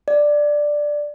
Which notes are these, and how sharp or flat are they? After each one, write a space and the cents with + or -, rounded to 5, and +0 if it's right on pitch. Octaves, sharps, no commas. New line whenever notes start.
D5 +5